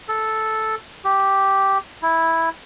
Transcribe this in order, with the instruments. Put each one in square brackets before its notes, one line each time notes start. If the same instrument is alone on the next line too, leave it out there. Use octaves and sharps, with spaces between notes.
[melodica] A4
G4
E4